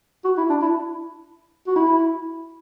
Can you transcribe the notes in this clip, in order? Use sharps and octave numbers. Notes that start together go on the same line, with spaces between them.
F#4
E4
D4
E4
F#4
E4